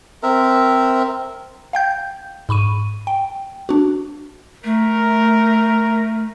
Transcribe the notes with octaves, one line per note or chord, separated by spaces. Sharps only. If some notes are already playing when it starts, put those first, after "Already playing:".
C4 A#4 E5
F5 G5 G6
G#2 B5 C#6 D#7
G5
D4 F#4
A3 A#4